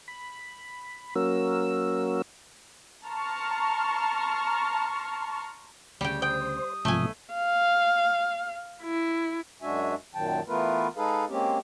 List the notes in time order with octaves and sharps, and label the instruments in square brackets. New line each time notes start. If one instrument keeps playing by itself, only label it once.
[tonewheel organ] B5
F#3 A#3 C#4 F#4 A#4 E6
[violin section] A5 A#5 C6 C#6 F6
[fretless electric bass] D2 C#3 [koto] G3 G5
[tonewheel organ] C5 [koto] G5 [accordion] D#6
[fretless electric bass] B1 [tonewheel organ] G#2 C3 F3 [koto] A3 G#5
[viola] F5
E4
[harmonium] F#2 G#3 D4 F#4 E5 G#5
F#2 A#2 D#3 F#3 G5 A5
E3 A3 B3 F4 A#4 B4
G#3 D#4 G#4 A4 B4 F5
G#3 A#3 C4 C#4 G4